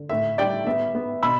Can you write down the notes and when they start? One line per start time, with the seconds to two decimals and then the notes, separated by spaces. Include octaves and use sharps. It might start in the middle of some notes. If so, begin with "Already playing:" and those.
Already playing: D3
0.09 A2 E5
0.38 G3 D5 G5
0.67 B3 E5
0.95 B3
1.23 B2 B5 E6